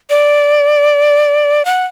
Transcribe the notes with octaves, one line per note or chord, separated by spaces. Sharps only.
D5
F#5